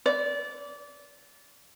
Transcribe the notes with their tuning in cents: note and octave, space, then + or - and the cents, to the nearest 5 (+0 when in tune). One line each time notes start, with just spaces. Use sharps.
D5 -25